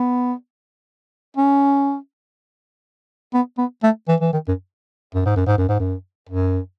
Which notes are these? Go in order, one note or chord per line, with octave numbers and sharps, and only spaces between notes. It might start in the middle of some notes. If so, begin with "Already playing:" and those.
Already playing: B3
C#4
B3
B3
A3
E3
E3
D#3
F#2
F#2
G#2
F#2
G#2
F#2
G#2
F#2
F#2